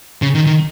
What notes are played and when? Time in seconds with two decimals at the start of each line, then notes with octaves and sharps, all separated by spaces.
0.22 C#3
0.35 D#3
0.47 D#3